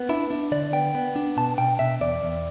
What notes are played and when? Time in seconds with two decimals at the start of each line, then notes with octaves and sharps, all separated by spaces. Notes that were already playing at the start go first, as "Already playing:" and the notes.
Already playing: B3
0.09 D4 E4
0.31 D4
0.52 D3 D5
0.72 B3 G5
0.95 B3
1.16 D4
1.37 B2 A5
1.58 B2 G5
1.79 B2 E5
2.01 E2 D5
2.22 E2